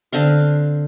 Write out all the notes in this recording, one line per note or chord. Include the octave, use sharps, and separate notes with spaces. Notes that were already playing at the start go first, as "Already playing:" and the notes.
D3 C4 F5